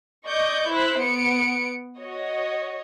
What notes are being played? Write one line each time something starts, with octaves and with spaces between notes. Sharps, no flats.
D5 D#5 C#6 G6
E4 C5 F#6 B6
B3 C#7 D7
F#4 C#5 D#5